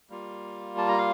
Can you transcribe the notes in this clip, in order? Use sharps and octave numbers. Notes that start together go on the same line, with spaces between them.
G3 A#3 F4
A5
A#5
F5